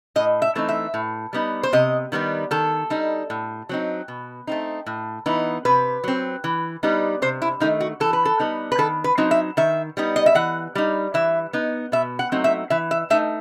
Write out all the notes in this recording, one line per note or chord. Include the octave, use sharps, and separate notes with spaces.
A2 D#5
E5
E3 A3 C4 D#4
E5
A2
G3 B3 D#4
C5
C3 D#5
D#3 G3 B3 D#4
D#3 A4
G3 D#4
A2
F#3 C4 D#4
B2
A3 C4 D#4
A2
E3 B3 D#4
C3 B4
F#3 C4
E3
G3 B3 D#4
C3 C5
E4
D#3 A3 D#4
F#4
E3 A4
B4
A4
G3 B3 D#4
B4
D#3 A4
B4
F#3 C4 D#4
E5
D#3 E5
G3 B3 D#4
D#5
E5
E3 F#5
G3 D#4
E3 E5
B3 D#4
B2 E5
F#5
F#3 A3 C4 D#4
E5
E3 E5
E5
A3 D#4 E5